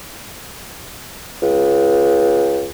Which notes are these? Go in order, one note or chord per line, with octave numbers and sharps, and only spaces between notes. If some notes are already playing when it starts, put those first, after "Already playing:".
C#2